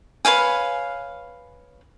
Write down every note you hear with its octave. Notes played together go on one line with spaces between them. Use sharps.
B4 C#5 F5 G#5